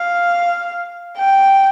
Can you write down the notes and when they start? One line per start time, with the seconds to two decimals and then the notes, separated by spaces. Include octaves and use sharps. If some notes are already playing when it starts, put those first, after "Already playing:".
Already playing: F5
1.17 G5